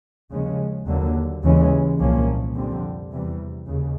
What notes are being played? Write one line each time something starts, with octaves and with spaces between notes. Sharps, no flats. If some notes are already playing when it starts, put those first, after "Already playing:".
D#2 C#3 F3 G#3 C#4
D#2 D3 F#3 A#3
D#2 C#3 E3 G#3 C#4
C2 A#2 F3 A#3 C#4
F2 D3 G3 C4
E2 C3 E3 G3
D#2 C#3